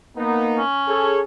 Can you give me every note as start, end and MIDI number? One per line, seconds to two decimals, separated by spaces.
0.17 0.61 58
0.17 0.61 59
0.17 0.61 63
0.58 1.20 61
0.88 1.21 68
0.88 1.21 69
0.88 1.21 73